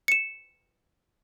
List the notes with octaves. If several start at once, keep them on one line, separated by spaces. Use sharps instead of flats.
C#7 E7